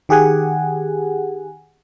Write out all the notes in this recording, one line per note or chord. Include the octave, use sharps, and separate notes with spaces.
D#3 G4 G#4 F#5 G#5